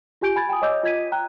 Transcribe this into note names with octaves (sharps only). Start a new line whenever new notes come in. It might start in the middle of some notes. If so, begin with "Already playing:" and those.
F4 G4 G#5 G6 D7
G#5 B5 G#6 A6
G5 G#5 D#6
C#5 D#5 D6 E6 G6
F4 D#5 G#6 B6 D#7
G5 A#5 F#6